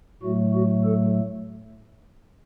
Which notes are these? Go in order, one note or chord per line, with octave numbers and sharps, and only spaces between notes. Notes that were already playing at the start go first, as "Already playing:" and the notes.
A2 F#3 A3 F#4
F#4
A4